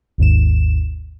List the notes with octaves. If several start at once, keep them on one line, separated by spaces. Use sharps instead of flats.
G#1 D#2 G#2 E7